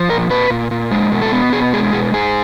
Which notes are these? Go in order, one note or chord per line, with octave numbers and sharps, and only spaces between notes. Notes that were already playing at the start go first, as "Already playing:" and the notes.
Already playing: F3
A#2 A#4
A#2 B4
A#2
A#2
G#3
B2
A4
B3
B2 G#4
G#3 G#4
B2 G#4
G#2 G#4